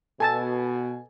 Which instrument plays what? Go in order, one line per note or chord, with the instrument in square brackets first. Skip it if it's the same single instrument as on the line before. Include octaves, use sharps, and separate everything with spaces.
[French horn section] B2 [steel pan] A4 A5 [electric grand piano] G#5 A6